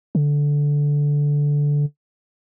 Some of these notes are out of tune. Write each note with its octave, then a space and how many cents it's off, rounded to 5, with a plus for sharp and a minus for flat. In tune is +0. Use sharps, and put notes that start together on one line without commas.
D3 -10